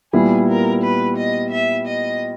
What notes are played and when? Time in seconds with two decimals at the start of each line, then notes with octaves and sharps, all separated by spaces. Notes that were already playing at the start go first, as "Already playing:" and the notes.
0.13 A#2 G3 B3 E4 G#4
0.47 A#4
0.83 B4
1.17 D#5
1.52 E5
1.87 D#5